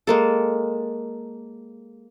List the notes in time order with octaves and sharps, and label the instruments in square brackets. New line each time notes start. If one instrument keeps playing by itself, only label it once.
[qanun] G#3 A#3 A4